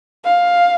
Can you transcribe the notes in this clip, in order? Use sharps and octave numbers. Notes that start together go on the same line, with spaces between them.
F5